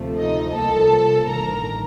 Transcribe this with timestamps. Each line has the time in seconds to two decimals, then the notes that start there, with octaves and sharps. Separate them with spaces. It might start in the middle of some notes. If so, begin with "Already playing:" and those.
Already playing: D2 C3 F3 A3
0.18 D#4 D#5
0.54 C2 C3 F3 A#3 A4 A5
1.29 A1 G2 D#3 A#4 A#5